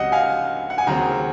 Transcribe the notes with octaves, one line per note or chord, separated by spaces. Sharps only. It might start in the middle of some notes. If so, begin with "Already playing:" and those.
Already playing: C#2 C3 F#3 D#5 F#5
F5 G#5
F#5
G#5
D#2 C#3 F#3 C4 F#5 A#5